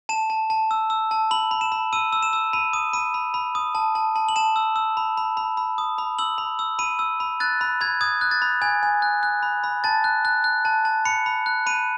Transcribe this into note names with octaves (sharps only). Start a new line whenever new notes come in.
A5 E7
A5
A5
E6
E6
A5
B5 F#7
B5
E7
B5
E6 D#7
E6
E7
E6
B5 D#7
D#6 D#7
B5 D#7
B5
B5
D#6
A5
A5
A5
F#7
A5 E7
E6
E6
B5
B5
B5
B5
D#6
B5
E6 F#7
B5
E6
B5 D#7
E6
B5
F#6 A6
B5
B5 G#6
D#6 G#6
F#6
A6
B5
G#5 G#6
G#5
F#6
F#6
B5
B5
A5 A6
F#6
F#6
F#6
A5
A5
B5 C#7
B5
F#6
B5 D#7